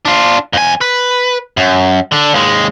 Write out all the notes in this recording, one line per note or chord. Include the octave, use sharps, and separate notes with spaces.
D4 F4
F2 G#5
B4
F#2
D3 D4
D#2 G#3